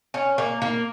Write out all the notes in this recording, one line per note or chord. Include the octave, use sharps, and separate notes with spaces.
C#4
A#3
A#3